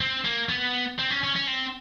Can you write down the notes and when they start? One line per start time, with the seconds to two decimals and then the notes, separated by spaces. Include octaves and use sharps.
0.01 C4
0.25 A#3
0.49 B3
0.99 C4
1.10 C#4
1.24 C#4
1.36 C#4
1.47 C4